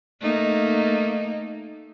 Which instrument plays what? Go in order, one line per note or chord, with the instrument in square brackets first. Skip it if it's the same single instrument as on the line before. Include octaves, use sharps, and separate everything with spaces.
[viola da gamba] A3 A#3 D#4